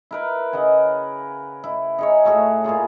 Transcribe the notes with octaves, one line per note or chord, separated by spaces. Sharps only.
E4 A#4 B4
C#3 D#5 F#5 G#5
E4
D#4 G#4 C#5
A2 A3 F#4 G#4
A#2 E4 F4 G#4